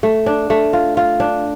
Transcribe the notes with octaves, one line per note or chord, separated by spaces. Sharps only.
A3
D4
A3
F4
F4
D4